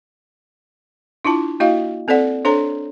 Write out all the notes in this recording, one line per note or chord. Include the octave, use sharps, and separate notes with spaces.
D4 E4 F4 A5
A#3 E4 F#4 D#5 F5
C4 A4 C5 D5 F#5
D4 A4 C5 C#5 A#5